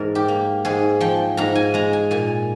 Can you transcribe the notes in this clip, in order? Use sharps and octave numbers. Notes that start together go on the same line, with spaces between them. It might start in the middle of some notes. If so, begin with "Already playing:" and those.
Already playing: G#2 E3 A#4
G4
A#3
G#2 G#4
F3 G5
G#2 A#5
G#5
G#3 A#5
G#5
A#2 G#5